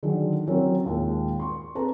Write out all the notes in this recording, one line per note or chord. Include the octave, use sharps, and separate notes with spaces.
D3 D#3 F#3 G#4
F#3 C4 C#4 E4 A#4 C#5
D#2 A#2 G#3
C6 C#6
C4 G#4 A4 B4 A5 A#5